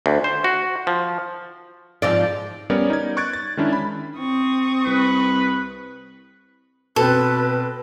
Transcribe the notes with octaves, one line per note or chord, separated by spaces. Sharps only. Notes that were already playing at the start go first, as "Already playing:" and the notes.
D2
C5
F#4
F3
G#2 F3 C4 D5
G3 B3 C#4 A#4 C#5 D5
D#4 D5 G#6
C#6 F#6 G#6 A6 D7
A6
D#3 G#3 C#4 D4 E4
B5
C4 C#6 D#6
C2 B4
B2 C4 A4 B4